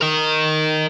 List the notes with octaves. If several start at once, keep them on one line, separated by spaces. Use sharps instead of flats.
A#4 D#5